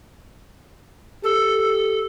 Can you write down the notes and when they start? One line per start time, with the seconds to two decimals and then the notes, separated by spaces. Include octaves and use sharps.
1.23 G4 A4